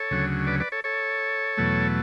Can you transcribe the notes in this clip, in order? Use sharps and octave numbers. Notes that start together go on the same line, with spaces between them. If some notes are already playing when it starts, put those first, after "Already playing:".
Already playing: A4 C#5
D2 C#3 F#3
B4 D5
B4 D5
A4 C#5
A4 C#5
E2 B2 F#3 A3